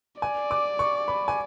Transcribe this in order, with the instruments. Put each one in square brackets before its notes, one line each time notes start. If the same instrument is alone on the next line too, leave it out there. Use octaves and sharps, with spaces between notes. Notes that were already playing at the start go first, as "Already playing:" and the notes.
[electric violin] D5 [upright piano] G#5
[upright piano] D6
C#6
B5
G#5